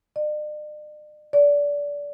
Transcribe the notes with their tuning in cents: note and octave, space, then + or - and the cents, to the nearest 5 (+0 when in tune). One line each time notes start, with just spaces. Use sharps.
D5 +45
D5 -25